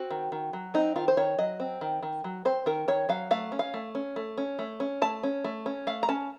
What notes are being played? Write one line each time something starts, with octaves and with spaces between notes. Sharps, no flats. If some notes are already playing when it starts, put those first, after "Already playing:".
Already playing: C4 F#4
D#3
D#3
F#3
C4 D#4
D#3 F4
C5
D#3 C#5
F#3 D#5
C4
D#3
D#3
F#3
C4 C5
D#3 A#4
D#3 C#5
F#3 F5
A3 F5
C#4
F5
A3
C#4
A3
C#4
A3
C#4
A3 A5
C#4
A3
C#4
A3 F5
A#5
C#4 A5